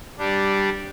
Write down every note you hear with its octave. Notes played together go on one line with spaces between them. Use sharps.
G3 D4